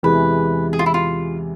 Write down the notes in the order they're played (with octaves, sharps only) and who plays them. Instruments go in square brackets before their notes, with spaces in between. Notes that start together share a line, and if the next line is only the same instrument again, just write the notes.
[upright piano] E2 C3 E3 G#3 [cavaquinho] B4
[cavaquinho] G#4
F4
E4
F4